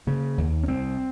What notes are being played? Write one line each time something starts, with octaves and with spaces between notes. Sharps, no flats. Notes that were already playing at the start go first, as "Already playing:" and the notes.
C#3 A#3
D#2
C#4
C2 C4